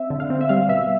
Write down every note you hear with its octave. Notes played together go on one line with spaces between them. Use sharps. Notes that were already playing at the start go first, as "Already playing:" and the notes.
Already playing: C4 E5
D3
F5
C4
E5
G3 F5
B2 E5